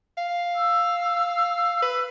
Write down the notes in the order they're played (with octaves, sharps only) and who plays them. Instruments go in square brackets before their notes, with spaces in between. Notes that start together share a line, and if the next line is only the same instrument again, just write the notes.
[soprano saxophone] F5
[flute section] E6
[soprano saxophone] B4